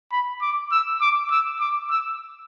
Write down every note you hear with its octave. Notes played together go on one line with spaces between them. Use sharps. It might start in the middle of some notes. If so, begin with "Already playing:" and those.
B5
D6
E6
D6
E6
D6
E6